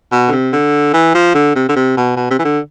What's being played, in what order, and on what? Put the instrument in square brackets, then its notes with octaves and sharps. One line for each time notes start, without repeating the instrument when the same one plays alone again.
[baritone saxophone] B2
D3
C3
D3
E3
F3
D3
C3
D3
C3
B2
B2
C3
E3
D3